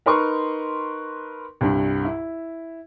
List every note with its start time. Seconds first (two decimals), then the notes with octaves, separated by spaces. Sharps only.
0.06 D#4 A#4 B4 C6 C#6
1.61 C2 G2
2.05 E4